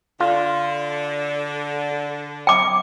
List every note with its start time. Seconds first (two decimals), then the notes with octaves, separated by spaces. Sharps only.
0.20 D3 F4
2.47 G5 D6